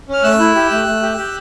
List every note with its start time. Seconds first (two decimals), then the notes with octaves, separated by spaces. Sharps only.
0.08 C#4 F6
0.23 A3 E6 F#6
0.39 E4
0.55 G4
0.71 A3
0.86 A3
1.02 G4
1.17 G4